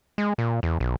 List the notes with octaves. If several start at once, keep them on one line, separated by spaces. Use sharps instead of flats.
G#3
A#2
E2
B1